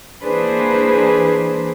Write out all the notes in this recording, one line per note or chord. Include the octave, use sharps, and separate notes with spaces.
E3 A#3 D4 G#4 B4 C5